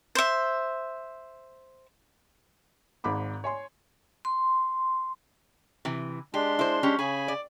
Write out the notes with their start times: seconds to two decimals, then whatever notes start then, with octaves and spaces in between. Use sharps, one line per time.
0.15 C5 E5
3.04 G#1 G#2 B5 D6
3.44 C#5 G#5 C6
4.25 C6
5.85 C3 E3
6.34 G#3 D4 G4 C6
6.59 E4 C5
6.83 C#4 G4
6.99 C#3 G#4 G#5 B5
7.28 D5